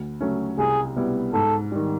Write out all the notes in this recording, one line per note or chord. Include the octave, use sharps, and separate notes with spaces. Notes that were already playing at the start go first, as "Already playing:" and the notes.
Already playing: D2
C#3 F#3 A3 C#4
C2 G#4
B2 G3 B3 E4
G#2 A4
D#3 G3